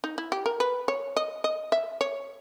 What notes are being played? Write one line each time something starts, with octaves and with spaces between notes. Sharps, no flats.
D#4
E4
G4
A#4
B4
C#5
D#5
D#5
E5
C#5